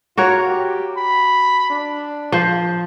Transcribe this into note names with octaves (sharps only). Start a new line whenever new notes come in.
F4 F#4 A#4 C#5
G4
B5
D4
F3 C5